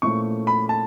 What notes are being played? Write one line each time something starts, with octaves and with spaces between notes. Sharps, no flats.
A#2 F3 A3 C#4 E4 C#6
B5
A5